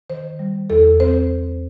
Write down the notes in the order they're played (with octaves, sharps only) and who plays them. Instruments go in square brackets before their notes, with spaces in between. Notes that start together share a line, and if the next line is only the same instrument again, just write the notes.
[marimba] D#3 C5
G3
E2 A4
C4 C5